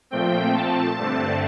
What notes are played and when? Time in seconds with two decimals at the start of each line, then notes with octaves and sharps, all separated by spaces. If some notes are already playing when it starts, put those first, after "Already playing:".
0.11 A#2 F3 A3 C4 G5
0.55 A5
0.98 G2 D3 A3 C4